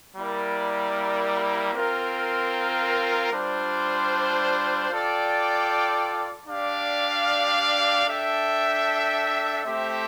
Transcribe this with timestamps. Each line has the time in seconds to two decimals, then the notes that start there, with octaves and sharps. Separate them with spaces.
0.17 G3 A#3 E4 A#4 D5
1.74 C4 F4 A#4
3.32 G3 D4 F4 C5
4.90 F4 A4 D5 G5
6.48 D4 G4 D5 F5
8.06 D4 A4 E5 G5
9.64 A3 C4 G4 C5 E5